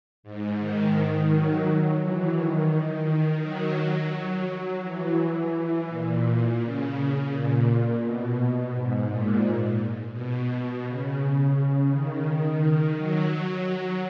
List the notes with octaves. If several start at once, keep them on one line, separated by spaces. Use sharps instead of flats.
G#2
D#3
F#3
F#3
E3
D#3
D#3
F#3
E3
A#2
C#3
A#2
B2
G#2
A#2
B2
C#3
D#3
F#3
F#3